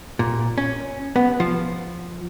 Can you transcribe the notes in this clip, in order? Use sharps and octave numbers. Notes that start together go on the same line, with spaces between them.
A#2
C#4
B3
F3